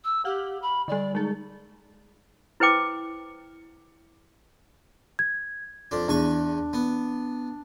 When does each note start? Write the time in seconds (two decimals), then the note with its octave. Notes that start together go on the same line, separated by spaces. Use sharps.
0.04 E6
0.25 G4 F5 F#5 F6
0.61 B5
0.88 D3 G3 D5
1.15 G#3 D#4 G#4
2.60 E4 B4 C5 G5 D6
5.19 G#6
5.91 F2 D4
6.08 E2 D4 G#5 C#6
6.73 B3